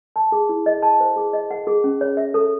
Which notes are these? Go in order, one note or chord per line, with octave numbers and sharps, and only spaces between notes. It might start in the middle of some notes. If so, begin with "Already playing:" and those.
A5
G#4
E4
D#5
A5
C5
G#4
D#5
F#5
G#4
C#4
C#5
E5
A4